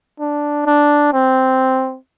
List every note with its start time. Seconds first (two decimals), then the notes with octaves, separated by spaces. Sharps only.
0.20 D4
0.66 D4
1.13 C4